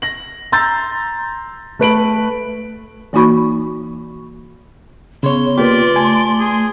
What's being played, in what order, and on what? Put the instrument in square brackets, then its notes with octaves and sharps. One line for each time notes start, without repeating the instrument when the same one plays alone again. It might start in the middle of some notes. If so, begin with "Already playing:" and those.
[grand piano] A#6 F#7
A#5 C6 E6 G6 A6
A3 B4 D7 F#7
[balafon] E3 A#3 D#4 F#4 B5 C#6
[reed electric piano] C#3 C#5 [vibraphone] B3 G#4 [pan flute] C6
[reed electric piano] C#3 A#3 G4 [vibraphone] F4 B4 [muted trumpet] D5
[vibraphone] A3 [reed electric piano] G#5
[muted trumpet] G#4